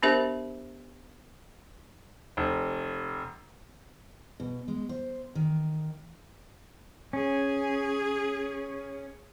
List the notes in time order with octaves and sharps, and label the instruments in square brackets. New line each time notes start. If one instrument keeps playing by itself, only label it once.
[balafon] B3 D4 G4 A#4 C5 E5
[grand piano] F1
[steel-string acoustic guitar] B2
G#3
C5
D#3
[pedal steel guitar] C#4 [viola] G#4